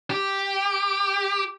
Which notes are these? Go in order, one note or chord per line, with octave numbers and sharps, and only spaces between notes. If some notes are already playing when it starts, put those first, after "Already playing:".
G4